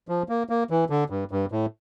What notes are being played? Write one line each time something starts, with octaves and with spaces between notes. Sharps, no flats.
F3
A#3
A#3
E3
D3
G2
G2
A2